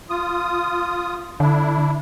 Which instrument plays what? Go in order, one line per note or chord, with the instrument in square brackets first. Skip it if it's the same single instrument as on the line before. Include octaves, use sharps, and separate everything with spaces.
[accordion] F4 D#6
[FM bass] D3 [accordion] D4 E4